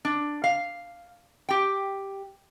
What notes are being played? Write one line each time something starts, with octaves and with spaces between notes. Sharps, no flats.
D4
F5
G4 G5